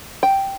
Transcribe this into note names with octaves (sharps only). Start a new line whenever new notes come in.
G5